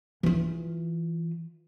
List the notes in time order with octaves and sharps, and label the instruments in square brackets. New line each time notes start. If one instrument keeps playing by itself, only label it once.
[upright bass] E3 F4